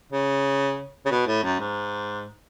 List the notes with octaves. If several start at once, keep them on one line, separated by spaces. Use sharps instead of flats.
C#3
C#3
B2
A2
F#2
G#2